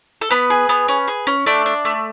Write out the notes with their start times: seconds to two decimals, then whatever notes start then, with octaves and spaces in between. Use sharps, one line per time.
0.21 A4
0.31 B3 B4
0.50 G#4
0.69 B3
0.88 C#4
1.08 G#4
1.27 C#4
1.46 A3 D4 D5
1.66 D4
1.85 A3